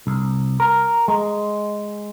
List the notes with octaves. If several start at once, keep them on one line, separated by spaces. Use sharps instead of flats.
C2
A#4
G#3